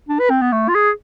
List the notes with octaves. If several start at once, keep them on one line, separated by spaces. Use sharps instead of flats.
D4
B4
C4
B3
A3
F4
G#4